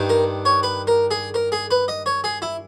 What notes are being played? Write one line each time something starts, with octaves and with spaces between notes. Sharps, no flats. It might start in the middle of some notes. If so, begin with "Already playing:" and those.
Already playing: G2 D#3
A#4
C#5
B4
A#4
G#4
A#4
G#4
B4
D#5
C#5
G#4
E4